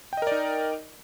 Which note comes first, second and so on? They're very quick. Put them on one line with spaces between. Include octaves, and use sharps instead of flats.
G5 D#5 A#4 D5 D#4